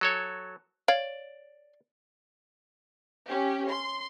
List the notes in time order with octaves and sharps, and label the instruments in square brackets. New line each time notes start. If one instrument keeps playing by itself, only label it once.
[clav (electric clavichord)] F#3 A4 C#5
[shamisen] C#5 F5 [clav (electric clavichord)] D5
[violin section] C#4 G4
C6